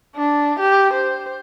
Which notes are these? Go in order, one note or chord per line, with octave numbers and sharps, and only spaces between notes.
D4
G4
C5